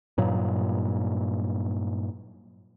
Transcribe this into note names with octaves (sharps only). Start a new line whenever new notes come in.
G2 A#2 F#3